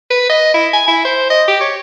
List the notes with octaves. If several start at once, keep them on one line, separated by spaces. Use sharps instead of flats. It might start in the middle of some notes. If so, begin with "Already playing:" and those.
B4
D#5
E4
G#5
E4
C5
D#5
G4
C#5